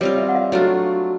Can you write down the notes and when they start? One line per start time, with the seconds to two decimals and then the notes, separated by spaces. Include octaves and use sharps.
0.01 G3 C4 F4 C#5 D#5
0.18 D5 E5
0.29 F#5
0.35 D#5 F5
0.52 F#3 A3 D4 F4